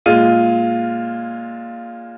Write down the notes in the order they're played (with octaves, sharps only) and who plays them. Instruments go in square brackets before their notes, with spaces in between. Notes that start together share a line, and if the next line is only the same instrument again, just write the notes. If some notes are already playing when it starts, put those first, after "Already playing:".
[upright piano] A#2 G#3 F4 D#7